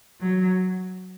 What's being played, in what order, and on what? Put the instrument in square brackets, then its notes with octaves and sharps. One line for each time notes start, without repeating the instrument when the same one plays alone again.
[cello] F#3